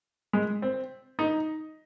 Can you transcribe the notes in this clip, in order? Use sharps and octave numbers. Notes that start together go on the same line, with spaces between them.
G#3
C4
D#4